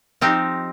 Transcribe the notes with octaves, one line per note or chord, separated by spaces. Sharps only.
F3 C4 D#4 G4